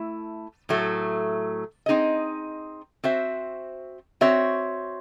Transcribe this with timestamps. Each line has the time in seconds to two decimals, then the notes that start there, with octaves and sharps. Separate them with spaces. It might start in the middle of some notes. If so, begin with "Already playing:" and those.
Already playing: A3 E4
0.69 A2 F#3 A3
1.86 C4 D#4 G#4 D#5
3.04 C4 F#4 C5 E5
4.21 C4 F#4 C#5 E5